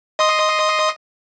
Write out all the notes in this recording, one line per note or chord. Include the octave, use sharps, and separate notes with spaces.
D#5 C6 D#6